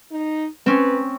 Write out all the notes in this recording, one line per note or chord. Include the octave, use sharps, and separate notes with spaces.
D#4
C4 C#4 B4